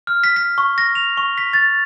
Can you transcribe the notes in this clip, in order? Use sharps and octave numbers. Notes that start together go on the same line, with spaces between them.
F6
B6
B6
C#6
A#6
F7
C#6
B6
A6